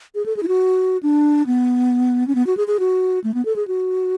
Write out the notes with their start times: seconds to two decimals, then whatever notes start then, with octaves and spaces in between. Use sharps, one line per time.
0.15 G#4
0.26 A4
0.37 G#4
0.43 E4
0.48 F#4
1.03 D4
1.47 B3
2.28 C#4
2.35 B3
2.47 F#4
2.57 G#4
2.68 G#4
2.80 F#4
3.24 A3
3.34 B3
3.45 A4
3.56 G#4
3.68 F#4